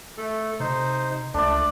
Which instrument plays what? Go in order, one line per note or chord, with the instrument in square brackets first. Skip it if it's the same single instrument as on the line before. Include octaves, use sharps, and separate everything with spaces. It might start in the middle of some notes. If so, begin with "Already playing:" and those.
[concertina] A3 A4
[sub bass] C3 [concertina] D#4 C5
[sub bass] C#2 [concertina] A3 [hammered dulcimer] D4 D5